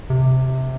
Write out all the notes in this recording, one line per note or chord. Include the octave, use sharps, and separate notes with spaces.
C3